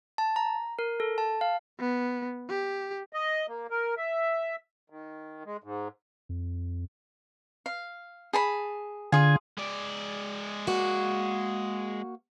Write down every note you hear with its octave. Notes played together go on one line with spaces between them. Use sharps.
A5
A#5
A#4
A4
A5
F5
B3
G4
D#5
A#3
A#4
E5
D#3
G#3
G#2
F2
F5
G#4 A5 B5
D3 F4 G#4 G#5
G#3 D5
A#3 F#4